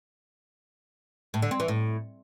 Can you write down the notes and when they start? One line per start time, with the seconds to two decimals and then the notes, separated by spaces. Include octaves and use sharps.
1.34 A2
1.42 D3
1.51 C4
1.60 E3
1.68 A2